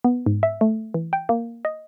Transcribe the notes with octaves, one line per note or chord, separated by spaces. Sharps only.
B3
G#2
E5
A3
E3
G5
A#3
D#5